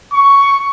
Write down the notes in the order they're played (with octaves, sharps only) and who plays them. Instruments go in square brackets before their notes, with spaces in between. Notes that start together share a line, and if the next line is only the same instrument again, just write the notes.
[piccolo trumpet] C#6